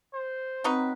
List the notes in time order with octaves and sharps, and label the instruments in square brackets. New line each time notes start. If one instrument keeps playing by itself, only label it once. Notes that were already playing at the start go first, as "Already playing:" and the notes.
[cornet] C5
[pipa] F#3 D#4 B4 [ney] C4